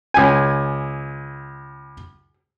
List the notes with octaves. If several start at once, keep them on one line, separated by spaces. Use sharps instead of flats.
C#2 G#5